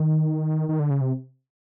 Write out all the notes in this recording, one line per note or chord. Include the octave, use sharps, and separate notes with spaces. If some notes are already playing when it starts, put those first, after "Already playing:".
Already playing: D#3
D#3
D3
C#3
C3